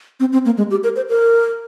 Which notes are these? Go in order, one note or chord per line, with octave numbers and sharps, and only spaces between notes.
C4
C4
A#3
G#3
G4
A#4
C5
A#4